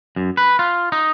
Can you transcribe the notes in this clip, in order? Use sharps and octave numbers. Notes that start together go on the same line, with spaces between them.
F#2
B4
F4
D#4